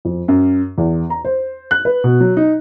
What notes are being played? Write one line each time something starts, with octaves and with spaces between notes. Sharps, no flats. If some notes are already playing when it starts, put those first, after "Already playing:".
F2
F#2
E2
A#5
C5
F#6
B4
B2
F#3
D#4